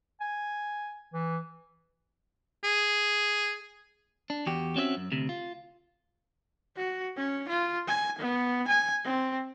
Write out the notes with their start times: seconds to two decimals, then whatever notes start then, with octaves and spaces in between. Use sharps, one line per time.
0.21 G#5
1.13 E3
2.64 G#4
4.30 D4
4.46 E2 F#4 G4
4.76 C4 C#4 F#4 D5 E5
4.97 F#2
5.12 D2 C3
5.29 F4
6.76 F#4
7.17 C#4
7.49 F4
7.88 G#5
8.19 B3
8.68 G#5
9.05 C4